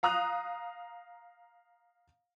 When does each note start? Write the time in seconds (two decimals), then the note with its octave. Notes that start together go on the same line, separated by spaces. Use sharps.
0.03 F5 A#5 D#6 F#6 F7